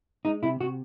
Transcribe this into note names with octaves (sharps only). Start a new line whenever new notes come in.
G#3 D#4
C3 E4
C3 F#4